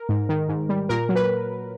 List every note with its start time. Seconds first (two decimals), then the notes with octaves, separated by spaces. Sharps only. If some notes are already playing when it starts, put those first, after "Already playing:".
Already playing: A#4
0.09 G#2
0.29 D#3
0.49 G#2
0.69 G3
0.89 A#2 A#4
1.09 F#3
1.16 B4